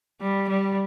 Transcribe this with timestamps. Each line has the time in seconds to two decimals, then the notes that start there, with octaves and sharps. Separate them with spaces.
0.21 G3
0.49 G3